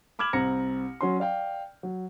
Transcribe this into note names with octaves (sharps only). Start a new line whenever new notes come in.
B5 D6 F6 G#6 E7 F#7
C2 C4 A#5 A#6 C#7
F#3 C#4 C6
D5 F5 G5
F#3